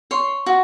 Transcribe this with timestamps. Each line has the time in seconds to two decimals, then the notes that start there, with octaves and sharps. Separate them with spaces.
0.11 C#5 C6
0.46 F#4